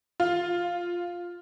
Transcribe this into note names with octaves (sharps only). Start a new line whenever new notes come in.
F4